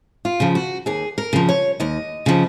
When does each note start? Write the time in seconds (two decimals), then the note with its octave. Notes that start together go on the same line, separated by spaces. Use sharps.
0.25 F4
0.40 C#3 F3
0.55 F#4
0.86 D#2 G#4
1.18 A#4
1.33 C#3 F3
1.49 C#5
1.80 D#2 D#5
2.26 C#3 F3